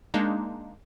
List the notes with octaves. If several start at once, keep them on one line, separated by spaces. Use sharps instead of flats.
G#3 A#3 D4 D#4